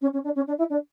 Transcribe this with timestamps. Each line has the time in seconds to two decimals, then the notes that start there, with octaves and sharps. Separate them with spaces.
0.01 C#4
0.13 C#4
0.24 D4
0.35 C#4
0.47 D4
0.58 E4
0.70 D4